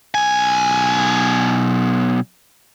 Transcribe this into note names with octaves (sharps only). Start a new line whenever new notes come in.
B1 G#5